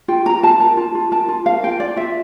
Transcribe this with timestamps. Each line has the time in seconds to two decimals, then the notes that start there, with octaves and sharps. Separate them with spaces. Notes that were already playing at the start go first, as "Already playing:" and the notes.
0.08 F4 G5
0.25 A#4 A#5
0.43 F4 A5
0.60 A#4 A5
0.77 F4
0.95 F4
1.11 A#4 A5
1.29 F4
1.45 A#4 F5
1.63 F4 G5
1.80 F4 D5
1.96 F4 E5